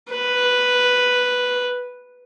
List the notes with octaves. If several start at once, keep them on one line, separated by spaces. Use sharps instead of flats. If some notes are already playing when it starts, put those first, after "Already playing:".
B4